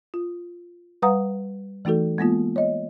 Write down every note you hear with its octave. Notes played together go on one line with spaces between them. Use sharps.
F4
G3 B4 F5 F#5 A#5 D#6
E3 A3 D#4 F#4 A4
G#3 A#3 B3 F4
C#5 D#5